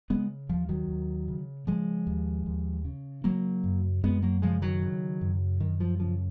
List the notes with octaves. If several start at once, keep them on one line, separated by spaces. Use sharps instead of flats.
C#3 G#3 B3
D#2 F3
D#3 F#3
D#2
C#3
C#3 F3 G#3
D#2
D#2
C#3
C#3 F#3 A#3
F#2
F#2 G#3 B3
F#3 A#3
C#3 F3 G#3
D#3 F#3
C#3
F#2
F#2 D#3
F3
C#3 F3